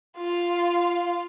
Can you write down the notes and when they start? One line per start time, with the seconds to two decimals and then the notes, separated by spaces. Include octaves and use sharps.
0.17 F4 F5